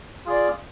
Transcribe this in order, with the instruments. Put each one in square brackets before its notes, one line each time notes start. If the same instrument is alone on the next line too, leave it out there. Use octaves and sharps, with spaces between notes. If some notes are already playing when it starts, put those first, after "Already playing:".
[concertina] F4 G#4 D5